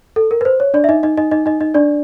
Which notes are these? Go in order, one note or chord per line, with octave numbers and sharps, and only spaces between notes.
A4
A#4
B4
C5
C#5
D4 D5
E5
D#4 D#5
D#4 D#5
D#4 D#5
D#4 D#5
D#4 D#5
D#4 D#5
D4 D5